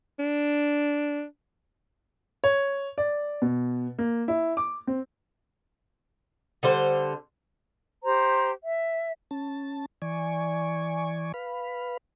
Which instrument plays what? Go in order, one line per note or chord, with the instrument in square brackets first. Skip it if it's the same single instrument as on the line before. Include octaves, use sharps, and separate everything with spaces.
[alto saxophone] D4
[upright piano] C#5
D5
B2
A#3
E4
D6
C4
[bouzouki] D3 G3 C5
[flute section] G4 C5 A#5
E5
[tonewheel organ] C#4 A5
E3 D5 G#5 C#6
B4 F5 B5